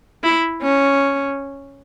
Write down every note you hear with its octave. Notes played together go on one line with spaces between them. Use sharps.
E4
C#4